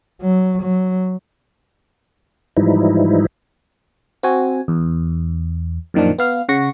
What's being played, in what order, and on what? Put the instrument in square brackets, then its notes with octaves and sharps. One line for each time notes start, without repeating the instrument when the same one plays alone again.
[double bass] F#3
F#3
[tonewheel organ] G#2 E3 F3 G3 D#4 E4
[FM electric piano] C4 F#4 G#5
E2
F#2 A#2 D#3 F3 D4
B3 F5 F6
C#3 F#5 C#6 A#6 C#7